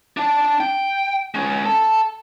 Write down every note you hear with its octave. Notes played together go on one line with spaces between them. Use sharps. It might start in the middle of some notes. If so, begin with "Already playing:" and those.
D4 A5
G5
G#3 C#4
A4 A5